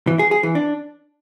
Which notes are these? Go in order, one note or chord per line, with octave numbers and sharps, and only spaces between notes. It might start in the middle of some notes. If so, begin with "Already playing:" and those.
E3
G#4
G#4
E3
D4